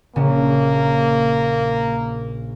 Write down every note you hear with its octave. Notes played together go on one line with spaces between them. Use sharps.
A#1 C#3 A#3